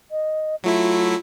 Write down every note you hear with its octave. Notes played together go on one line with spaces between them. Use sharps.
D#5
F#3 A3 E4 F4